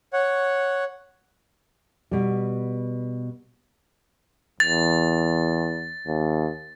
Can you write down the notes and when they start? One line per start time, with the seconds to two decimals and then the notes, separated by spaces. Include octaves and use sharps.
0.13 C#5 F#5
2.11 B2 G3
4.60 E2 A6
6.07 D#2